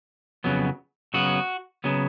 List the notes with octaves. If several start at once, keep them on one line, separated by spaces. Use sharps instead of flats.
F2 C#3 F#3 B3
C#3 F#3 B3 F#4
C#3 F#3 B3